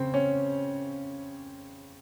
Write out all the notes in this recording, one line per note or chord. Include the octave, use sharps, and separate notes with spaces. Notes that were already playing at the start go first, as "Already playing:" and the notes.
Already playing: C#3 C4
C#4